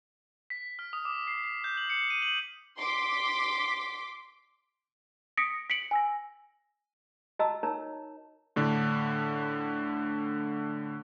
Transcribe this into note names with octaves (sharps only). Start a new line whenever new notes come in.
B6
F6
D#6
D6
C7
C7
G6
F#7
C#7
D#7
F#7
C6 D6 B6
D#6 A#6 B6 C#7 D7
B6 C#7 D7 F#7
G#5 E6 A#6
F#4 D#5 A5 A#5 E6
D#4 A#4 C#5 A5 A#5
A2 D3 D4